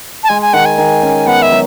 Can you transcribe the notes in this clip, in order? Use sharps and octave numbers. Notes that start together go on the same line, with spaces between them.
A5
G#3 G#5
G#5
D#3 F#5
G#5
D#3
C#4
B3 F#5
E5
F#3